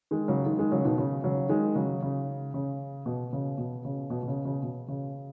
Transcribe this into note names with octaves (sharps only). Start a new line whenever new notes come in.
D#3 G#3
C#3 F#3
D#3 G#3
D#3 G#3
C#3 F#3
B2 D#3
C#3
C#3 F#3
D#3 G#3
C#3 F#3
C#3
C#3
B2
C#3
B2
C#3
B2
B2
C#3
C#3
B2
C#3